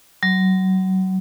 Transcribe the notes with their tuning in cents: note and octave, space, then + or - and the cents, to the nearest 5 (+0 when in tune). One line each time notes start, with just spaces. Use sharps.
F#3 +25